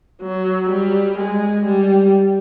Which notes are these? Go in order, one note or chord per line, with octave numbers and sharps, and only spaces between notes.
F#3
G3
G#3
G3